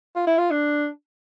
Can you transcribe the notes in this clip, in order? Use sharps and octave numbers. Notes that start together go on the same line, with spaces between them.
F4
E4
F4
D4